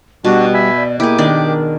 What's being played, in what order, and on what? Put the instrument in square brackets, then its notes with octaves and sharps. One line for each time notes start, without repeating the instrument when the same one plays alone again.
[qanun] B2 [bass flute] G3 [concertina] D4 F#4
[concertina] E5 G#5 B5
[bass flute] D5
[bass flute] A#3 [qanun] E4 G#4 [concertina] G4 D6
[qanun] D#3 D4
[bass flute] A#4